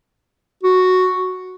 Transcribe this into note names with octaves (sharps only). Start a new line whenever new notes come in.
F#4